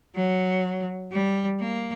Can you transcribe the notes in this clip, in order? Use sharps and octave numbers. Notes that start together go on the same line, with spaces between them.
F#3
G3
A#3